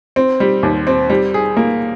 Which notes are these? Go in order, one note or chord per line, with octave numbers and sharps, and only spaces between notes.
C4
G3
D#2
C4
G3
G#4
A#3